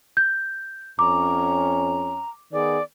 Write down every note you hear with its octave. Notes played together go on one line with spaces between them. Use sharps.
G6
F2 C#4 A#5 D6
D#3 B3 G#4 D5